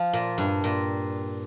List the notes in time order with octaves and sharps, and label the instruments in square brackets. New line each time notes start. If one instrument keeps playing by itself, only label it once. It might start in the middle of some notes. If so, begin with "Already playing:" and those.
Already playing: [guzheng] F3
A#2
G2
A#2